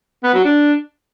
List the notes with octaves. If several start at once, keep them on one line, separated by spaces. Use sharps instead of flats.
B3
F#3
D4